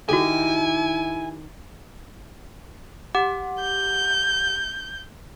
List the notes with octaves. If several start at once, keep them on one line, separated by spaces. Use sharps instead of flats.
D#3 E4 F#4 G4 A4 G#5
G4 F#5 D6
G6